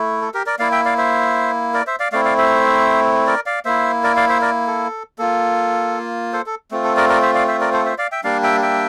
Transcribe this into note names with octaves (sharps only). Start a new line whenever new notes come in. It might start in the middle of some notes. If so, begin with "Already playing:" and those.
Already playing: A3 E4
A4
G4 A#4
A#4 D5
A#3 E4 D5 F5
E5 G5
D5 F5
C5 E5
A#4 D5
C5 E5
D5 F5
A3 C4 E4 D5 F5
D5 F5
C5 E5
A#4 D5
D5 F5
A#3 E4 C5 E5
A#4 D5
D5 F5
C5 E5
A#4 D5
A4
A#3 F4 A4
A4 C5
A4
A3 C4 F4
A4
A#4 D5
A#4 D5
C5 E5
D5 F5
C5 E5
A#4 D5
A4 C5
C5 E5
D5 F5
E5 G5
G3 A#3 D4 D5 F5
E5 G5
E5 G5